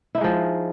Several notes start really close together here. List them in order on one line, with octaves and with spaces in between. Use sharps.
E4 D#4 G#3 F3